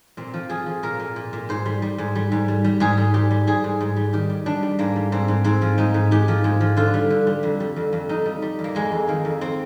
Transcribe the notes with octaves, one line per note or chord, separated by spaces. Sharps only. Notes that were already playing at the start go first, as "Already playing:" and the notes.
A#2 C4
F3
F3 G#4
F3
A#2 A#4
A#2
A#2
A#2
G#2 C5
G3
G3
G#2
G3
G#2
G3
G3
G#2 G#4
G3
G#2 G4
G3
G#2 G#4
G#2
G#2
G3
D#3 G4
G3
G3 D4
G3
G#2 A#3
G3
G#2 C4
G#2
G#2 C4
F3
G#2 D#4
G#2
G#2 G4
F3
G#2
F3
D3 F4
G3
D3
G3
F2
G3
F2
F2
F2 D#4
G3
G3
F2
A#3
F2 G#3
F2
D#3 A#3
F2
C4